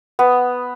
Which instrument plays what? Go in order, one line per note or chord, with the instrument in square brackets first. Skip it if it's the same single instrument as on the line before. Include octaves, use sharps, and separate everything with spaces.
[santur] B3